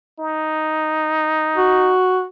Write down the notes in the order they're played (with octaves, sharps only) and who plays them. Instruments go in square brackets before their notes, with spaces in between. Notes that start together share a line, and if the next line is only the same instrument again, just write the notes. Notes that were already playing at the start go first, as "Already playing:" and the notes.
[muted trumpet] D#4
[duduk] F#4